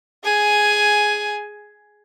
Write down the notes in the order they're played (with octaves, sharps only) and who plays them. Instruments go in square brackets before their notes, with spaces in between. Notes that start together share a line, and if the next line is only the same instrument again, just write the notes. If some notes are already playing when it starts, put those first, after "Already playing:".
[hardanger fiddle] G#4 G#5